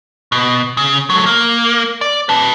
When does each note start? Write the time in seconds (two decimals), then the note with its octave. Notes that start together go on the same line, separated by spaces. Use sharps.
0.32 B2
0.77 C#3
1.10 F#3 A3
1.26 A#3
2.01 D5
2.29 B4 A5